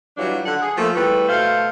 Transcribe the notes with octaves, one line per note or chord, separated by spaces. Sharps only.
E3 F#3 G3 D4 F4 C#5
D3 F#5
G#4
F3 A3 A#3
E2 G3 A3 B4
B2 A3 C5 F5